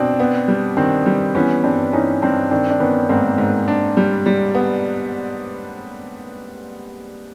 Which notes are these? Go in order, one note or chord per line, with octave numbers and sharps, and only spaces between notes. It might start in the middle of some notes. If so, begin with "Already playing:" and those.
Already playing: B2 C4 D4
B3
G3
D#3 C4 D4
G3
E3 B3 C#4
G2 C4 D4
E3 C#4 D#4
G2 C4 D4
D#3 C4 D4
D4
D#3 B3 C#4
G#2 A#3 C4
G#2
D4
G3
G3
B3